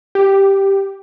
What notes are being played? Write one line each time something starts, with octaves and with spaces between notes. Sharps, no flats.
G4